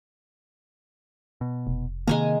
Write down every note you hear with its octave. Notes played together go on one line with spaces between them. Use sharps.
B2
F1
C3 D#3 G#3 A#3 G#5 A#5